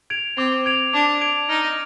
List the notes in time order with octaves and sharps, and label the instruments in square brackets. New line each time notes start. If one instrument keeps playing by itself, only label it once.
[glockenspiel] G#6 D7 F7
[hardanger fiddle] C4 [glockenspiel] D6
[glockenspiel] G#6 D7 F7
[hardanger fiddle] D4 [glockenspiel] D6
[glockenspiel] G#6 D7 F7
[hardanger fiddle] D#4 [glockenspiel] F6